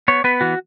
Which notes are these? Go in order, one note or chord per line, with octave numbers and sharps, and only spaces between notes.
B3 C#5
B3 B4
E3 F#4